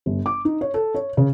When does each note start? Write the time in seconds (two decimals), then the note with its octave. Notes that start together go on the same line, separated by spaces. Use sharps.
0.06 G1
0.26 D6
0.45 D#4
0.61 C#5
0.74 A4
0.95 C#5
1.17 C#3